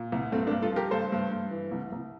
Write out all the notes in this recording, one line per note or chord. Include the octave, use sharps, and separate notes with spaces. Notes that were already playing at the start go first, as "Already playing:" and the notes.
Already playing: A#2
C2
G2 A3 C4
A#3 D4
G2
F4 A4
F3 G4 A#4
G2 A4 C5
G2
G2
E3
C2
C2